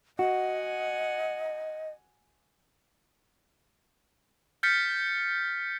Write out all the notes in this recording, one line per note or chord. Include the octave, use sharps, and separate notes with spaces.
F#4 D#5 F#5 G#5
F6 G6 A6 B6 C#7